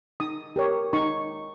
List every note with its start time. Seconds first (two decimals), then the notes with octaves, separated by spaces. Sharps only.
0.20 D#4 D#6
0.56 G4 A#4 C#5
0.93 D#4 C#6